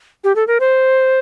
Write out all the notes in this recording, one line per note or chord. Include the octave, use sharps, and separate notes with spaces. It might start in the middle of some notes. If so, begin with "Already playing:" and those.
G4
A4
A#4
C5